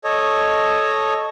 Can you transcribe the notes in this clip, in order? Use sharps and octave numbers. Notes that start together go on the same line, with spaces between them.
A4 C#5 D#5